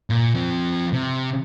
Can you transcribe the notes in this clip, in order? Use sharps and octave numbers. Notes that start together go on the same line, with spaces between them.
A#2
F3 C4
C3